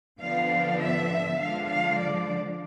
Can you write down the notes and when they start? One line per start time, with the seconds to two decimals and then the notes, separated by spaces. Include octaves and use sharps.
0.20 D3 F3 B3 D4 F5
0.79 E5
1.39 D3 F3 G#3 D4 F5
1.69 F5
1.98 D5